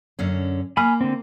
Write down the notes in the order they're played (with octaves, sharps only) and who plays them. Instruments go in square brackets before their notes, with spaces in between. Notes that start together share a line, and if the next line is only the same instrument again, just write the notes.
[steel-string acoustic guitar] F#2 D3 C#4
[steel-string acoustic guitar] A#3 [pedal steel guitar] G#5 B5 F6
[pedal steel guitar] D3 C4